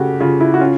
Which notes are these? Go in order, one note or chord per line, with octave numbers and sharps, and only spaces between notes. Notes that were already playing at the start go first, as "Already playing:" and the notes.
Already playing: C#3 A3 F#4 G4
C#3 F4
E4
F#4
C#4 F4